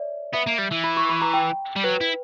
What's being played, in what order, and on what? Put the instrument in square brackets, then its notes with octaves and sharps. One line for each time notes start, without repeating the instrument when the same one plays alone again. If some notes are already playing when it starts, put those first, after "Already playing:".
Already playing: [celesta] C#5 D5 E5
[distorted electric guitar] B3 [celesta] E5
[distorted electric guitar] A#3
G3
E3
[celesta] B5
C#6
B5
A#5
G5
[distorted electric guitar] G3
[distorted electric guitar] F#3 [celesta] B4
[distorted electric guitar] E4